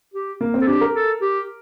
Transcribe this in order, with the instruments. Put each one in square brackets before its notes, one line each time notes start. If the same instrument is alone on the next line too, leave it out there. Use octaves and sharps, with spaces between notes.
[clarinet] G4
[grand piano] A#3
C4
[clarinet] A4
[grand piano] D4 [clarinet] G4
[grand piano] A#4
[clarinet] A4
G4